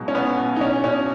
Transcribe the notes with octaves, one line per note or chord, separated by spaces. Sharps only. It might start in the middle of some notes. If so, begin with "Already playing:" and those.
Already playing: B1 B2 F#3 G#3
C#4
B1 B3
B2
D#4
B1 C#4
B2 C#4